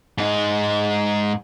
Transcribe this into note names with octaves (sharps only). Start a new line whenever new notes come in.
G#2 D#4